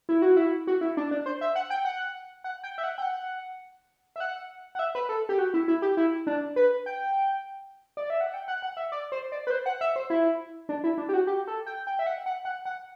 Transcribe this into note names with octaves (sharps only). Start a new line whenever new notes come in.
E4
F#4
E4
F#4
E4
D4
D4
C5
E5
F#5
G5
F#5
F#5
G5
E5
F#5
G5
F#5
E5
F#5
F#5
E5
B4
A4
G4
F#4
E4
E4
G4
E4
D4
B4
G5
D5
E5
F#5
G5
F#5
F#5
E5
D5
C5
D5
B4
C5
F#5
E5
C5
E4
D4
E4
D4
G4
F#4
G4
A4
G5
G5
E5
F#5
F#5
F#5
F#5